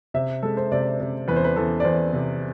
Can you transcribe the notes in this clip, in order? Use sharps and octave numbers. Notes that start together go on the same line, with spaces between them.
C3 E5
G#3 A4
C5
C3 D5
C3
E2 B4
C5
B4
E2 A4
D5
E2 C5
C3